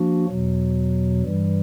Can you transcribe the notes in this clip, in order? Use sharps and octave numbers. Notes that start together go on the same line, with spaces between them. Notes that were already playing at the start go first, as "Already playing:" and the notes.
Already playing: F3 A#3 D4 F#4
E2 B2 F#3
G2 E3 G3